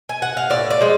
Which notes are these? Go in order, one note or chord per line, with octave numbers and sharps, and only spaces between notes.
G#5
F#5
F5
A2 D5
D5
F3 G#3